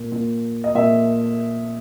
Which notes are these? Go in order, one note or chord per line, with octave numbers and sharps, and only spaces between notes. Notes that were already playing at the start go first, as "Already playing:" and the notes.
Already playing: A#2
A#2
D#5
A#2 E5